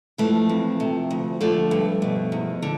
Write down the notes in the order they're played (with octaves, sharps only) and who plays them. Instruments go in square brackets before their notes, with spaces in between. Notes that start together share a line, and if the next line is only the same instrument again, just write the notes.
[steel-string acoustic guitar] E3 F3 A3
F2
C3
D2
D3 F3 A3
G2
B2
E2
D3